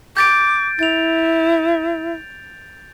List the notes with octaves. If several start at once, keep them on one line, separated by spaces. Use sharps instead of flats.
D6 G6 A6 D7
E4 A6 F7